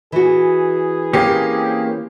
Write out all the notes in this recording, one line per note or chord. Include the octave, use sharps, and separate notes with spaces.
E3 F#4 G#4
A#3 C4 C#4 G4